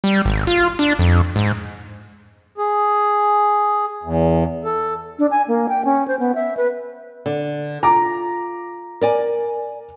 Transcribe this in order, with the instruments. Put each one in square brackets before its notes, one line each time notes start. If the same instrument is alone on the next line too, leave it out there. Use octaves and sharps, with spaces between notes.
[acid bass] G3
G#1
F4
D4
F2
G#2
[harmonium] G#4
E2
A4
[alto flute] D4
G#5
A#3
G5
C#4
C5
B3
E5
B4
[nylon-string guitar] D3
[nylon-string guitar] F4 [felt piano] A#5 D6
[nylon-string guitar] A#4 D5 G#5